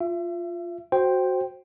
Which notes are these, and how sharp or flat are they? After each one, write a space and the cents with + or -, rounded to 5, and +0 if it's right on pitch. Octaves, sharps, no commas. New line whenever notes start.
F4 +0 E5 +35
F#4 +0 C5 +5 G5 +0